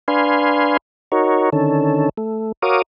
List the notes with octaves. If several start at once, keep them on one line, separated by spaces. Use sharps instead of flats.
D4 B4 F5 G#5 C6
D#4 F#4 A#4 C#5
D3 D#3 C#4 A4
A3
F#4 A#4 C#5 F5 D6 D#6